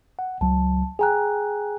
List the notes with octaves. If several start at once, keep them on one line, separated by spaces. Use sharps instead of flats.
F#5
C#2 F#3 A5
G#4 G5 G#5 A#5 F#6